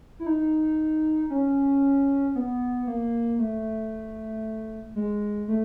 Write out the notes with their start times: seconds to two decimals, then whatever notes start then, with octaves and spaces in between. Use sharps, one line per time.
0.19 E4
0.26 D#4
1.30 C#4
2.35 B3
2.87 A#3
3.39 A3
4.95 G#3
5.48 A3